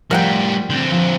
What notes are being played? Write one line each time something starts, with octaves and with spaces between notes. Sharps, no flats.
A2 F3 G3 F4 A#4 F#5 G5
D3 C4 C6 G6 A6
F3